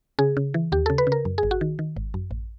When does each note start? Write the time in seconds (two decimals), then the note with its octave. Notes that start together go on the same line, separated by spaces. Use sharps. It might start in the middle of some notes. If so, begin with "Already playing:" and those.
0.19 C#3 G#4
0.37 C#3
0.54 E3
0.72 D#2 G4
0.86 C#3 A4
0.98 B4
1.07 C#3
1.12 A#4
1.25 F#2
1.38 G#4
1.43 G#1
1.51 F#4
1.61 D#3
1.79 D#3
1.96 G#1
2.14 F#2
2.31 A1